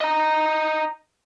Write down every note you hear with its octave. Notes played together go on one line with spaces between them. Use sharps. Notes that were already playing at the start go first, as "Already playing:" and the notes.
D#5 A#5